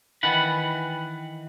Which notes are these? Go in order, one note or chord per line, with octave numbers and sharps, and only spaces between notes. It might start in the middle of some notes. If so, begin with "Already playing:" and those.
D#3 E3 F#5 B5